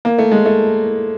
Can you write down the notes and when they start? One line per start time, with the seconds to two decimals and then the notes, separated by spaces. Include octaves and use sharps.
0.05 A#3
0.18 A3
0.32 G#3
0.45 A3